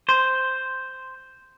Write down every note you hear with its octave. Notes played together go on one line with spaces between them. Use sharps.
C5